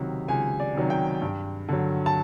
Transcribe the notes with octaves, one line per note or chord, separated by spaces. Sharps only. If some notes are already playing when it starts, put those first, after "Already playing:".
Already playing: C#2 C3 D#3 F#3
C#2 G#5
D5
C3 D#3 F#3
G5
G2
D3 F#3
A5